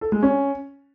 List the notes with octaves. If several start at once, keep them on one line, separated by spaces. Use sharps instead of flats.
A4
G#3
C#4